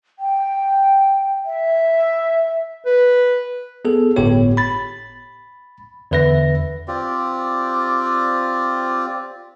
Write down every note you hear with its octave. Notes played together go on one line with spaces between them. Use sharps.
G5
E5
B4
B3 G#4 A4
G1 A2 B3 G4 C#5
B5 A6
E2 D3 B4 E5 A#6
C4 F4 G4 D5